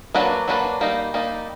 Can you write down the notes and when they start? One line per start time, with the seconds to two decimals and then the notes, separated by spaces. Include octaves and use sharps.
0.15 F#3 A#3 D4 F#4 B4
0.48 F#3 A#3 D4 F#4 B4
0.81 G3 A#3 D#4
1.14 G3 A#3 D#4